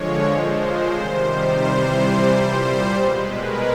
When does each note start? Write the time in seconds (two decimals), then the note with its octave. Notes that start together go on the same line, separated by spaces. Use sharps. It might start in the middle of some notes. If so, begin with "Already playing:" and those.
Already playing: D3 F3 G#3 C#5
0.24 A#2 F3 G#3 C5
0.91 C3 D#3 G3
1.58 C3 E3 G3 C5
2.25 A#2 G3 C5
2.92 B2 G#3 B4
3.25 A#4